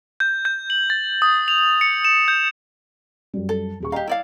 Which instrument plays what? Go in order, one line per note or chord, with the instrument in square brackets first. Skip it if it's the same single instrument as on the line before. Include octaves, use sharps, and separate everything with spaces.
[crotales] G6
G6
F#7
A6
D#6
F7
C#7
E7
G6
[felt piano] F#2 G3
[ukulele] A4
[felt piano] D#1 G#4 C#6
[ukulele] G4 F5 [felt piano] D#5 G5 A#5
[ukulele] E4 D5 F5